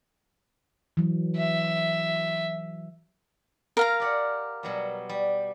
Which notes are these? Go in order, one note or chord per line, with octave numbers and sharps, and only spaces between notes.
E3 F#3
E5
A#4 F5 A#5
G4 D5 F#5
B2 F#3 G3
G3